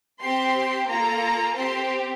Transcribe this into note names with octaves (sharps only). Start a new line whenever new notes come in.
C4 G4 C6
A#3 F4 A4 A#5
C4 G4 C6